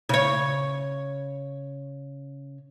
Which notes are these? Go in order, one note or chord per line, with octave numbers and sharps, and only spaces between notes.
C#3 C#5